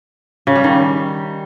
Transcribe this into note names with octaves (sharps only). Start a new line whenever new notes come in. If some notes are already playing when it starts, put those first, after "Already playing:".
C#3
G3
D#3